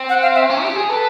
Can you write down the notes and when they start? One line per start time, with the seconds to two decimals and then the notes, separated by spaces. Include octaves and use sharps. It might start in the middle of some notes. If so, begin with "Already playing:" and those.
Already playing: C4
0.09 F#5
0.22 F5
0.35 E5
0.50 C#4
0.63 G4
0.76 G#4
0.89 A4 B4